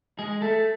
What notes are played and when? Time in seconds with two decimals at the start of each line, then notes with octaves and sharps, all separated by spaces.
0.19 G#3 G#4
0.42 A3 A4